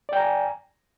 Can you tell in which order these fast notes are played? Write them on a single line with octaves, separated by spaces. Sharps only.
D5 G5 A#5 G#5